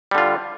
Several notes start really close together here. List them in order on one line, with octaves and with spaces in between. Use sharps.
G3 D3 F4